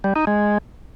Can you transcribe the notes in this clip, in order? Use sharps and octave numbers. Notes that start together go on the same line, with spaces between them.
G3
D#4
G#3